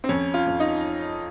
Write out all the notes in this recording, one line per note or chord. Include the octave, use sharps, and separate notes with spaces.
C4
F2 C#4
F4
F2
D#4